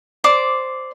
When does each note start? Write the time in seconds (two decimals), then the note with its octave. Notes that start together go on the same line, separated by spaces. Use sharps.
0.24 C5 D5 D6